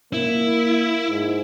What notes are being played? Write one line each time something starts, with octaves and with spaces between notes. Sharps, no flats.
A#3 E4
G#2